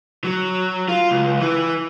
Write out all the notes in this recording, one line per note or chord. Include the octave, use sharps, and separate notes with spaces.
F#3
F4
C#2
E3